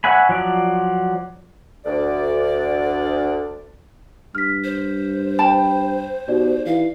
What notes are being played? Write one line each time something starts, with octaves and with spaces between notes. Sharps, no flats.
C#5 E5 F#5 G#5 B5
F3 F#3 D5
D2 D5
G2 F6 B6
C5
G5 A5 B5
B2 D#4 G4 D5
E3 F5